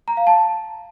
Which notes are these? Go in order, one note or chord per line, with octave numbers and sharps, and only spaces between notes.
A#5
F5
A5